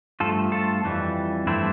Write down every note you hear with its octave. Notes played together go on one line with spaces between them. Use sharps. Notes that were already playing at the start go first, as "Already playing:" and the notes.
G2 F3 A3 F4 A4
F4 A4
F2 E3 G3
G2 E3 A3 C4 E4